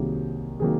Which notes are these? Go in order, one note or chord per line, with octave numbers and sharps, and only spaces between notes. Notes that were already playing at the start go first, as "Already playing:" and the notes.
Already playing: C2 C3 D#3 F#3 A#3 G#4
C3 D#3 F#3 A#3 G#4